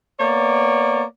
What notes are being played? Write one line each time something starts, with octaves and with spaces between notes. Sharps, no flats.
A#3 B3 C#5 D5